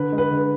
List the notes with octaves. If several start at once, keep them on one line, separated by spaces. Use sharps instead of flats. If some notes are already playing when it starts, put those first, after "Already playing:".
Already playing: D3 B4
G#3
B4
D3